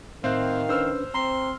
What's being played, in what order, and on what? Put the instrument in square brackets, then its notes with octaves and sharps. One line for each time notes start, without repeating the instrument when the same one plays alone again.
[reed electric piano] A2 E5 F#6 [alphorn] D#3 [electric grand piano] C4 C5 [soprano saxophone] F5
[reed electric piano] C#4 D4 B4 [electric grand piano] C5 E6 F6
[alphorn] C4 [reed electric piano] A#5 [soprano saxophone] C6